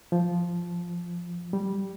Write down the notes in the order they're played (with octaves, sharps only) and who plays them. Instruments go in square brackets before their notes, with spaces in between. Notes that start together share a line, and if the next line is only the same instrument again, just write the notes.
[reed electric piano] F3
G3